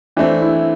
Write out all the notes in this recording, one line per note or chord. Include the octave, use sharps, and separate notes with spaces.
E3 A3 C4 D4
E4